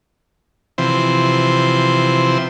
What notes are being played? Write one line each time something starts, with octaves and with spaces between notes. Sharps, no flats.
C3 E3 F3 C5